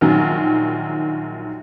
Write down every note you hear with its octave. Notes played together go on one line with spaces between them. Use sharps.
A#1 D#3 F#3